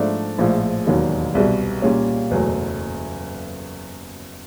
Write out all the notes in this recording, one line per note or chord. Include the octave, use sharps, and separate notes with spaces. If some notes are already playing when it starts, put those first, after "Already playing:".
Already playing: G#2 F3 A3 D4
A#1 A2 F3 G#3
E1 D#2 D#3 F#3
C2 B2 G3
A#2 G3 A#3 C#4
F#1 E2 B2 F#3 A3